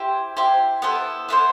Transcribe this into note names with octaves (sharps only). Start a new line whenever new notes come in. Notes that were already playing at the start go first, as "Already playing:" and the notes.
Already playing: E4 G4 C5
E4 G4 C5
B3 E4 A4 C5
B3 E4 A4 C5